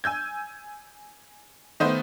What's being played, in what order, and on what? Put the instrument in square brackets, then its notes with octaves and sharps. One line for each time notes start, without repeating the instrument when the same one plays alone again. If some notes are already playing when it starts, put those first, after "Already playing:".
[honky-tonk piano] G#5 E6 G6 G#6
D#3 A3 B3 C5